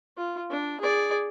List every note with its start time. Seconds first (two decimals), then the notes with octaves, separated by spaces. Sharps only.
0.17 F4
0.50 D4
0.80 G#4 D5